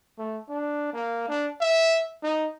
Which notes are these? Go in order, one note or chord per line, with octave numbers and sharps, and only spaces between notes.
A3
D4
A#3
D4
E5
D#4